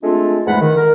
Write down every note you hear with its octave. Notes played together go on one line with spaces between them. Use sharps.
G#3 A3 C4 D4 F4
E2 G#2 G#3 A3 F#5 B5
D#3
A#4